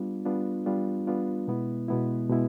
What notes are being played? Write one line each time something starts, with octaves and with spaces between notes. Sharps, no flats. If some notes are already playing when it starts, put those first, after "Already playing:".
Already playing: G3 B3 D4 F4
G3 B3 D4 F4
G3 B3 D4 F4
G3 B3 D4 F4
B2 G#3 B3 E4
B2 G#3 B3 E4
B2 G#3 B3 E4